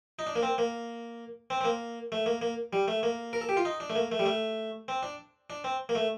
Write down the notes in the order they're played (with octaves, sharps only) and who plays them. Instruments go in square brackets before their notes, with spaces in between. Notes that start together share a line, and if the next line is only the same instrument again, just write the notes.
[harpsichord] D#4
D4
A#3
C4
A#3
C4
C4
A#3
A3
A#3
A#3
G3
A3
A#3
A#4
A4
G4
F4
D#4
D4
A3
A#3
A3
G3
A3
C4
D4
D4
C4
A#3
A3